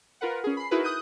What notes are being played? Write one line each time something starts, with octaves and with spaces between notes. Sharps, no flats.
F4 A#4 B4 F#5
C#4 G#4
B5 C7
D#4 E4 F#4 G#4 A#4 B4
D#6 F#6 G6 D#7